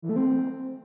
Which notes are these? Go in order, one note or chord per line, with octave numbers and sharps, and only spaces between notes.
E3
A3
C4